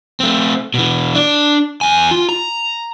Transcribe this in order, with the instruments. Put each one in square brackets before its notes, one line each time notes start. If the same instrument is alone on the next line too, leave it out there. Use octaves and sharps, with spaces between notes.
[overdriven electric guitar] A3 C4
B2 E3
D4 D5
E2 G#5
F4
A#5